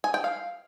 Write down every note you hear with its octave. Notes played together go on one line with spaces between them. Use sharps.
G#5
G5
F5